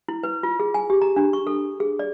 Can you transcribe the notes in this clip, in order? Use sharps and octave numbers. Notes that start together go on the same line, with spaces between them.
E4
B4
F4
G#4
G#5
G4
A#5
D4
C#6
A4
G#4
D5